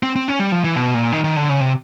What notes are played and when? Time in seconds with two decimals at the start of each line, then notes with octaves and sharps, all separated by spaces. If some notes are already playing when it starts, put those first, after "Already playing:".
0.03 C4
0.16 C4
0.28 C#4
0.39 G3
0.52 F3
0.64 E3
0.76 B2
0.94 A#2
1.12 D#3
1.24 D#3
1.37 D3
1.49 C#3
1.61 C3